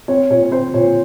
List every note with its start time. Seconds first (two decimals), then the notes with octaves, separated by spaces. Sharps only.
0.08 C4 C#5
0.30 A#2 C#5
0.43 C#5
0.51 C4 C5
0.74 A#2 C#5